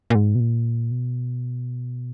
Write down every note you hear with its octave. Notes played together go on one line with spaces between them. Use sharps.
A#2
G#2
B2
A#2
B2